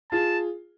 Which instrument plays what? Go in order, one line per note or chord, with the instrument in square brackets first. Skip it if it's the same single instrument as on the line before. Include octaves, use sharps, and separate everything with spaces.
[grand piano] F4 G#4 [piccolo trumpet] A5